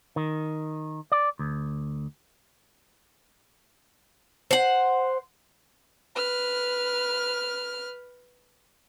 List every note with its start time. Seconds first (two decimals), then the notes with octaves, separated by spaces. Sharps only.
0.16 D#3
1.12 D5
1.39 D2
4.51 C5 F#5
6.15 B4 F6